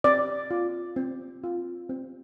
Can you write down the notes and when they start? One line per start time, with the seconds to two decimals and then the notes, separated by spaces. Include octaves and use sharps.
0.04 C4 D5
0.51 F4
0.96 C4
1.44 F4
1.89 C4